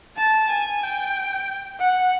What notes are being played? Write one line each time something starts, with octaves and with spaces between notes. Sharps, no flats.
A5
G#5
G5
F#5